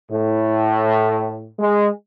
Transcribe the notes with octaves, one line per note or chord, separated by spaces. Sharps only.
A2
G#3